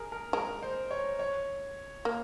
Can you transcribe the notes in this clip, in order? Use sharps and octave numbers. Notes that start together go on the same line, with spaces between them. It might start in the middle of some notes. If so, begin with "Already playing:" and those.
Already playing: G#4 A#4
A#4
G#3 A#4
C5
C#5
C#5
A#3